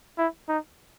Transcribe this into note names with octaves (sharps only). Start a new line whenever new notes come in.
E4
D#4